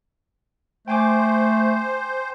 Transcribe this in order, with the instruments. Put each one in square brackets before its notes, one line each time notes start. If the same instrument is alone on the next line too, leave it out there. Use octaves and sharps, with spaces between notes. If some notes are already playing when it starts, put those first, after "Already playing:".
[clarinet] A3 [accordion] C5 [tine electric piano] G5 G#5 D6